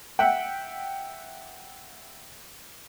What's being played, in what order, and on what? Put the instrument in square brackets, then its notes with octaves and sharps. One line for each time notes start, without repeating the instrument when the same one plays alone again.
[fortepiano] E5 F#5 G5